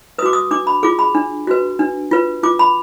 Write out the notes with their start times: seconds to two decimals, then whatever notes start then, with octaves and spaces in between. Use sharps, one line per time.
0.18 B4 D#6
0.23 F#4 D6
0.33 D#6
0.51 D4 D6
0.67 B5
0.83 F4 G#4 D6
0.99 B5
1.15 D4
1.47 F#4 B4
1.79 D4
2.11 F4 B4
2.43 F4 D6
2.59 B5